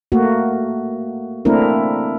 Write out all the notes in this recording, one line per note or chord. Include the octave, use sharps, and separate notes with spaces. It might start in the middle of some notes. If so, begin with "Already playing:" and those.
A3 A#3 F#4
A3 A#3 C4 D4 E4 A#4